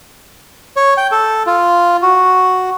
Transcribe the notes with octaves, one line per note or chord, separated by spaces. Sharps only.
C#5
G5
A4
F4
F#4